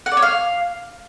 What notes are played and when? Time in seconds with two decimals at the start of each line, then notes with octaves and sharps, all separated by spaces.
0.06 F#5
0.12 D5
0.17 C#5
0.22 F5